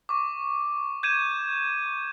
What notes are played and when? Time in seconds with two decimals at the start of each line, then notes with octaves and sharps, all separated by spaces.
0.09 C#6 D6
1.03 G6 G#6 D#7 E7